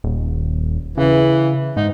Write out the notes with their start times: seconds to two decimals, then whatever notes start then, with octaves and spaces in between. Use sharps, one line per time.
0.04 D#1
0.98 C#3 E3
1.77 G#2 D#4